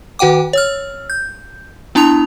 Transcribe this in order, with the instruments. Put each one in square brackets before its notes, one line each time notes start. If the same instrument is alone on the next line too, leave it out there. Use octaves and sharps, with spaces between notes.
[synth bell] D#3 F#4 F#5 G5 D6
C#5 E6 F6
G6
B3 D4 E4 A5 D#6 F7